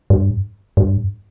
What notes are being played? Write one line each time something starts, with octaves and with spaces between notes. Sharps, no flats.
G2
G2